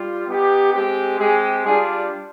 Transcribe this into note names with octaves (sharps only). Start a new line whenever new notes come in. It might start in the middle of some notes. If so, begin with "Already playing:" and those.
Already playing: G3 F4
B3 D#4 G4
G#3 C4 G4
G#3 C4 G4 G#4
G3 D4 F4 G#4